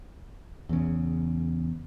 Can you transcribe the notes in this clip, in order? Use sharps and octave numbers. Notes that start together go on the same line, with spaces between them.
E2 C#3